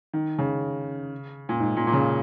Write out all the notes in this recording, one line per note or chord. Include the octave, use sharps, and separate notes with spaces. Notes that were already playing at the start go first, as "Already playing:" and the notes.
D#3
C#3
A#2
G#2
A#2
A#2
C#3